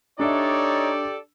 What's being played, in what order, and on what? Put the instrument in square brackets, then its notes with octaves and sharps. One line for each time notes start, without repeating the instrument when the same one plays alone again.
[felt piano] D4 E5 [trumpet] D#4 [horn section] G4 A4 D5 [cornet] C#5